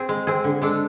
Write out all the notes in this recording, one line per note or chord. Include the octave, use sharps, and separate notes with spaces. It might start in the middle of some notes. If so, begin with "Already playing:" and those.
Already playing: C4 G#4
G#3
C4 G#4
D3
G#3 D4 A4